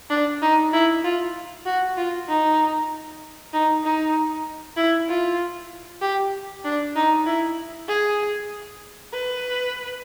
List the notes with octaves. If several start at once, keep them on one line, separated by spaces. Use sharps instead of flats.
D4
D#4
E4
F4
F#4
F4
D#4
D#4
D#4
E4
F4
G4
D4
D#4
E4
G#4
B4